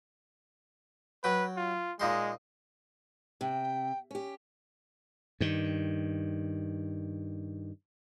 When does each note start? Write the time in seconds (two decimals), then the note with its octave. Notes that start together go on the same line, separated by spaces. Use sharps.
1.24 F#3 B4 G5
1.57 F4
2.00 A#2 G#3 D#4 C6
3.41 C3 G5
4.11 C#4 G4
5.40 G2 D#3